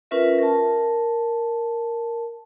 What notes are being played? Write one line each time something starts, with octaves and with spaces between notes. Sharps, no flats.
C#4 F4 A#4 B4 E5
A#4 A5